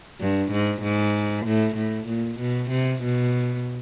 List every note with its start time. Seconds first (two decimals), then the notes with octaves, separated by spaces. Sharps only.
0.20 G2
0.52 G#2
0.82 G#2
1.46 A2
1.76 A2
2.07 A#2
2.39 B2
2.70 C3
3.03 B2